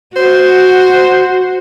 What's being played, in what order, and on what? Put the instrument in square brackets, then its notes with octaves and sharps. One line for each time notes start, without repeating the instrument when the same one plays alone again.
[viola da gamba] F#4 [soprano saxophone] C5